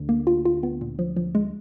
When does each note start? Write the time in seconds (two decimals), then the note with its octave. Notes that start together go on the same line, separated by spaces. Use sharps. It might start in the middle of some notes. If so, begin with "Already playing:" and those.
Already playing: D2 D3
0.09 A#3
0.27 F4
0.45 F4
0.63 B3
0.81 A#2
0.99 F3
1.16 F3
1.35 G#3